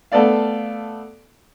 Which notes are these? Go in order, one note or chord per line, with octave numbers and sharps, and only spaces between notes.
A3 B3 A4 D5 F5